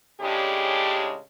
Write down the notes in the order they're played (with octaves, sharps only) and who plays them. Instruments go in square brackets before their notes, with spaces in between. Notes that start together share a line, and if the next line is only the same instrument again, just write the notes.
[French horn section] A2 C#3 G#3 D4 G4